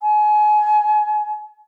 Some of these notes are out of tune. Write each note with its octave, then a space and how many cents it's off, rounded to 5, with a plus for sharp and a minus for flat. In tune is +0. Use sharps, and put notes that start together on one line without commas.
G#5 +30